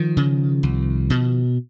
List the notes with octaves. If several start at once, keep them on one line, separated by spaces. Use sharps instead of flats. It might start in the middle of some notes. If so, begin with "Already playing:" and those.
Already playing: D#3 F3
C#3
C2
B2